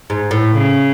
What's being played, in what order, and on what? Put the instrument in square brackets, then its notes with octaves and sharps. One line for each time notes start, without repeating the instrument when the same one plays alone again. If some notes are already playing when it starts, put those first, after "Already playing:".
[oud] G#2
A2
[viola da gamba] C#3